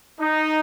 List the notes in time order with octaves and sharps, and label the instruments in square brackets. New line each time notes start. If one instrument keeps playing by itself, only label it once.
[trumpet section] D#4